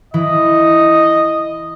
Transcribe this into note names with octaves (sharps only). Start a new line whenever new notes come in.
E3 E4 D#5